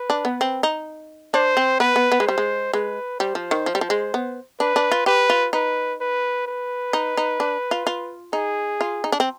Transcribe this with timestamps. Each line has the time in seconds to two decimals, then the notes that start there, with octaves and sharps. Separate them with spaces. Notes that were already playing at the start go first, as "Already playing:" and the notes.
Already playing: B4
0.10 D4
0.25 B3
0.41 C4
0.63 D#4
1.34 D4 C5
1.57 C4
1.80 B3 B4
1.96 B3
2.12 B3
2.20 G#3
2.27 G3 C5
2.38 G#3
2.73 G#3 B4
3.20 G3 C5
3.35 F3
3.51 D#3
3.66 F3
3.75 G3
3.81 F3
3.90 G#3
4.14 B3
4.60 D4 B4
4.76 D4
4.91 F4
5.06 G4 B4
5.30 F4
5.53 D#4 B4
6.01 B4
6.47 B4
6.93 D#4
7.17 D#4
7.40 D4
7.71 F4
7.87 F4
8.33 D#4 G#4
8.81 F4
9.04 D#4
9.12 D4
9.20 C4